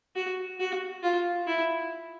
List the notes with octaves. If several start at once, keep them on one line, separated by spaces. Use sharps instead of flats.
F#4
F#4
F4
E4